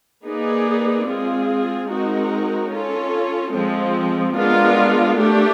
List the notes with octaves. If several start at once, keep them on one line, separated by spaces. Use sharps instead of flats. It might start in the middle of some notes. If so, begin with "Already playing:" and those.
A#3 D#4 G#4 B4 D5
G#3 C4 F4 G#4
G#3 C4 D#4 F#4 A#4
C#4 F4 A4
F3 G#3 C4
G#3 B3 D4 F4 A#4
A3 D4 G4